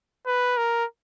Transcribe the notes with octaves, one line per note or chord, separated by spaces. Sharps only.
B4
A#4